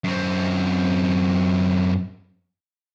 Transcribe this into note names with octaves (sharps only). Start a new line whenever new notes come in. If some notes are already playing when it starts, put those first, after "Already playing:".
F#2 C4